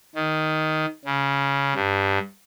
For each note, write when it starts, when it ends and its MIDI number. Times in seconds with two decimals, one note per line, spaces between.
0.15 0.86 51
1.05 1.74 49
1.75 2.19 43